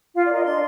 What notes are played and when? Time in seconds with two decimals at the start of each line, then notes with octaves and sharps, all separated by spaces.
0.15 F4 F5
0.25 D5
0.30 A#4
0.35 D#5
0.45 D4 C6